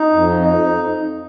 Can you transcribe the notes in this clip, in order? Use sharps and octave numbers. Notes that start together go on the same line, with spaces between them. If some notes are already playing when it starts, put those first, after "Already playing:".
Already playing: D#4
F2
D#4